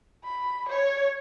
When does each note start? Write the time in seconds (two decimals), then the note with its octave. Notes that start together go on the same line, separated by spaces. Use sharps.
0.25 B5
0.69 C#5